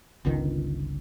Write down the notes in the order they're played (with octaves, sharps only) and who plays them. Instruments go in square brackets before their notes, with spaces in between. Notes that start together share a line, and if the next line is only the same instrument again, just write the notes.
[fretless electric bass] G1 C#2 D#3